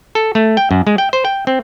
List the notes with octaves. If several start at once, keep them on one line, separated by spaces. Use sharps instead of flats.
A4
A3
G5
F#2
G#3
G5
C5
G5
C4